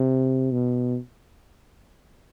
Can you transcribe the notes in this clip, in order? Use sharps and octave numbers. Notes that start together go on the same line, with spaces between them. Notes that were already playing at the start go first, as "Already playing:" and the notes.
Already playing: C3
B2